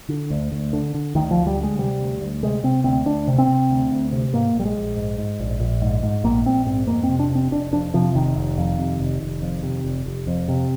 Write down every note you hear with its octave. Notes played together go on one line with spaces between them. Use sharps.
D3
D2
D2
D3
D3
D2 D#3
F3
D2
G3
D3
G#3
C3 G3
D2
D2
C3 G#3
C3 C4
D2 C4
D2 D4
C3
C4
C3
D2
D2
C3
G#2 A#3
A#1
G3
G#3
A#1
G#2
G#2
A#1
A#1
G#2
G#2
A#1 A#3
A#1 C4
G#2 C4
F2 A#3
C4
C3
D4
F1
C4
F1 D4
F2 D4
C3 F3
F1 D#3
F1
F2
C3
F1
F1
F2
C3
F1
F1
F2
C3